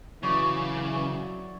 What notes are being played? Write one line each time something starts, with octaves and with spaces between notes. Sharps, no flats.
C#3 E3 F#3 C#5 D5 C#6